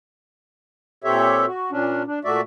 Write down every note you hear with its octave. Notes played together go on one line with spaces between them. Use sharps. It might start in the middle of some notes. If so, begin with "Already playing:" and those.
A#2 C4 G4 A4 C#5 E5
F#4
A#2 C#4 D4
D4
A#2 A3 F#4 D5 E5